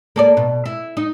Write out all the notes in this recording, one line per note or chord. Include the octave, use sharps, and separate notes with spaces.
A#3 A4 D5
B2
E4
D#4